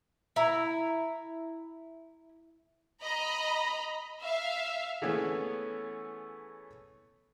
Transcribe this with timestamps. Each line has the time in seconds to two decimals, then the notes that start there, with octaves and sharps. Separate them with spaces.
0.36 E4 A#5
3.02 D#5 A#5 B5
4.21 E5 F5
5.02 E3 A3 B3 C#4 G#4 C#5